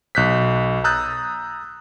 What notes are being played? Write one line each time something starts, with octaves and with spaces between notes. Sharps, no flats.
B1 F#6 G6 B6
A#5 D#6 E6 F#6 G6 A6